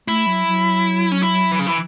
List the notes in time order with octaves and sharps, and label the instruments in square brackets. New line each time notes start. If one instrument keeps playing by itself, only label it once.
[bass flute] A3 [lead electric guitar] E4
[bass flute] F#3
F#3
[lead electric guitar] C#4
E4
E3
C#3
E3